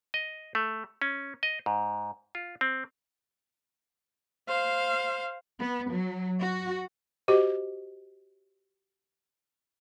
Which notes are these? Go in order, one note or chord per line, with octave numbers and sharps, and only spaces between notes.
D#5
A3
C#4
D#5
G#2
F4
C4
C5 F5
B3
F#3
F#4
F#4 G4 C5 D#5